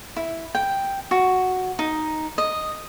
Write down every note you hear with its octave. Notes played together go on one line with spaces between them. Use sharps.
E4
G5
F#4
D#4
D#5